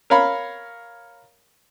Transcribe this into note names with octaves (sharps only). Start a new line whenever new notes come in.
A#4 C#5 F5 B5